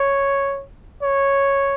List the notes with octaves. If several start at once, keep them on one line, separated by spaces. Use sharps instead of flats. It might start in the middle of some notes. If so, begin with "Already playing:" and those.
Already playing: C#5
C#5